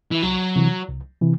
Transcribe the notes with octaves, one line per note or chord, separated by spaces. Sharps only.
E3
C2 F#3
C3 E3
C2
C3 E3